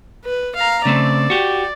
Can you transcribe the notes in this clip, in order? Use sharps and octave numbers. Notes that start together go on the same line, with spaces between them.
B4
F5 A#5
C#3 A3 C4 D5
F#4 G4